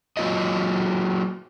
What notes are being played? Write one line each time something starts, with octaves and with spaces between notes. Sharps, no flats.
F#3 A#3 F4 D5 D#5